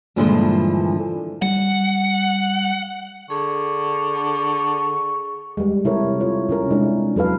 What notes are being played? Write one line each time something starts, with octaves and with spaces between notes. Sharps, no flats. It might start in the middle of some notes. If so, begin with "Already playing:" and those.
G2 A#2 D3 E3 F3 G#3
G3 F#5
D3 G#4 C#6
G3 G#3
C3 E4 A4 A#4 C#5
F4 C#5
C3 C#4 A#4
G#3 D4 E4
F#3 A4 B4 F5